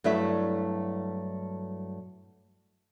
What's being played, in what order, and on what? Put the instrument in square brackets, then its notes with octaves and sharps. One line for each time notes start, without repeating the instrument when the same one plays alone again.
[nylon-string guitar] G2 F#3 A3 E4 E5